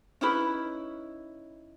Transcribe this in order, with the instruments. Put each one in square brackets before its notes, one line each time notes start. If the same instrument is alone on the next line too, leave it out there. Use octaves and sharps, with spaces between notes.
[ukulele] C#4 D#4 E4 B4